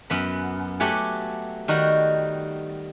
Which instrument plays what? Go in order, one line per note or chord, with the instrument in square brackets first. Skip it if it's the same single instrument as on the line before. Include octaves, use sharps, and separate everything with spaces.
[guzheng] F#2 B3 B5
F#3 A3 G4 F#5 G#5
D#3 G3 D#4 F#4